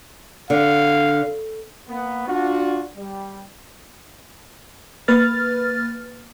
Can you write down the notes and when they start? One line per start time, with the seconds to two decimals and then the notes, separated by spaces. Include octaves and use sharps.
0.50 D3 F5
1.89 A#3 B3
2.27 D4 F4 F#4
2.95 G3
5.08 A#3 B4 F6 A6